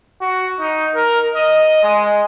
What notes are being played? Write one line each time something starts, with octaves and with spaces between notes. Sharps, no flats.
F#4
D#4
A#4
D#5
G#3